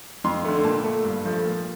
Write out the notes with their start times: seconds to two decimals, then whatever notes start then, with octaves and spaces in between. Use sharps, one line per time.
0.24 F2 C6
0.45 D3 A3
0.64 A#2 A5
0.84 A3
1.05 G2
1.25 F3 A3
1.45 A#2